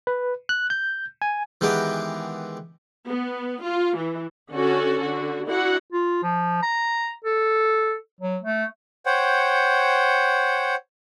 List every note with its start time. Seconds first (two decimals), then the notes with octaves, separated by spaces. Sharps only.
0.07 B4
0.49 F#6
0.70 G6
1.22 G#5
1.61 D#3 E3 G#3 B3 G4
3.08 B3
3.63 F4
3.97 E3
4.53 D3 C#4 F#4 A4
5.02 D3 F#4
5.48 D4 E4 F#4 F#5
5.93 F4
6.23 F3
6.63 A#5
7.24 A4
8.21 F#3
8.43 A3
9.06 C5 C#5 F#5 G5